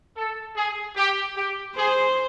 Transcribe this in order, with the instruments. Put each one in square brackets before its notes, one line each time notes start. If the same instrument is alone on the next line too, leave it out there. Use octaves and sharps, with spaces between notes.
[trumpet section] A4
G#4
G4
G4
[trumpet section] G#4 [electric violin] C5